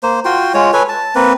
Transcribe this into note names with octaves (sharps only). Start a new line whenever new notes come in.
A#3 C5
F4 F#4 G5 C6
G#3 F4 C#5
A4 B4 C#5 G#5
A5
A#3 C4 B4